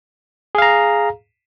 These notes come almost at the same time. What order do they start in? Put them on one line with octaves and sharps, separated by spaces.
G#4 F5 A#5